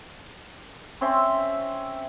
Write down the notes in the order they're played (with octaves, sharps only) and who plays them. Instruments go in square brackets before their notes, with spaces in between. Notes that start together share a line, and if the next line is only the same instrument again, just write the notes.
[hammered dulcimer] C4 C#4 E5 C6